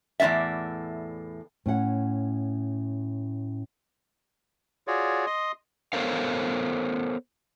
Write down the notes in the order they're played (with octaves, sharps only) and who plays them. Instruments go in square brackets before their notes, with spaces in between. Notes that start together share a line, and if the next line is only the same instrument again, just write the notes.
[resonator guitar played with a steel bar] E2 A2 C#4 D5 E5
[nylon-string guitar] A2 C#4 F#5
[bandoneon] F4 F#4 G#4 C#5 D5
D#5 C6 D#6
[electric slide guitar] B3 A4 A#4 C5 C#5 F5